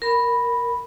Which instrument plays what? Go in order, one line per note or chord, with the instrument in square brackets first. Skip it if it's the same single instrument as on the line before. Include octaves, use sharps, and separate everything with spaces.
[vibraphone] A#4 B5